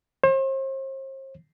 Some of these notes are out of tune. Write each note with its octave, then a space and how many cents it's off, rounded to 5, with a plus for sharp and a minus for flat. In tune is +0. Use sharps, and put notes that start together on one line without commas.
C5 +40